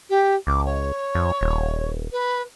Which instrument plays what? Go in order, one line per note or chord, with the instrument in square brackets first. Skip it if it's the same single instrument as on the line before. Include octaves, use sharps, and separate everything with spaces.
[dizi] G4
[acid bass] C#2 [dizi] D6
[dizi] C#5
[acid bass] F2
D#1
[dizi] B4